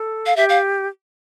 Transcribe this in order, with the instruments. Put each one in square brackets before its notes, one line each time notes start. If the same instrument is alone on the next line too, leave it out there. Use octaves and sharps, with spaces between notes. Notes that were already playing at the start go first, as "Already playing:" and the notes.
Already playing: [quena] A4
[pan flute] F5
[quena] G4 [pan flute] E5
[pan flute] F5